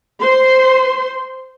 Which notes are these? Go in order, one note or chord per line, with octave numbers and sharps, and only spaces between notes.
C5 C6